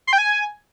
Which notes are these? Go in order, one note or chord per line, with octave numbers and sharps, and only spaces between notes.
C6
G5
G#5